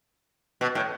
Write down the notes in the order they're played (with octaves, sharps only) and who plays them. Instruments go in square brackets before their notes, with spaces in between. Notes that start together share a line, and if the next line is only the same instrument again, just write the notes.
[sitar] B2
A2